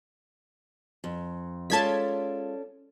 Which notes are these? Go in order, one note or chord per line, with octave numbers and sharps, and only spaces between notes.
F2
G#3 C#4 F4 A4 D5 A5 G#6 B6